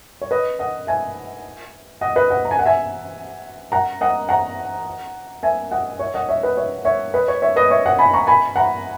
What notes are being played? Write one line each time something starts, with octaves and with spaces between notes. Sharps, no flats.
C#5
B4 D#5
D#5 F#5
E5 G#5
D#5 F#5
B4 D#5
D#5 F#5
A#5
G#5
F#5
E5 G#5
F#5 A#5
D#5 F#5
F#5 A#5
E5 G#5
D#5 F#5
C#5 E5
D#5 F#5
C#5 E5
B4 D#5
C#5 E5
C#5 E5
B4 D#5
C#5
C#5 E5
B4 D#5
C#5 E5
D#5 F#5
G#5 B5
A#5 C#6
G#5 B5
F#5 A#5